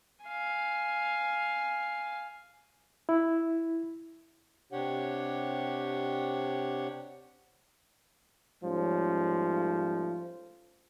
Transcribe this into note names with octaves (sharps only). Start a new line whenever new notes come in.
F5 G#5
E4
C3 D4 G4 C#5 F#5
G#2 F3 G3 A3 C#4